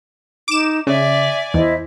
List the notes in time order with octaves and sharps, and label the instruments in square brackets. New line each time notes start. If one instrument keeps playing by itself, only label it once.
[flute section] D#4 [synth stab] D6 E7
[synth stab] C#3 [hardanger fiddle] D5 G#5 [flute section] E5
[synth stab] E2 [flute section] E4 C5 D#5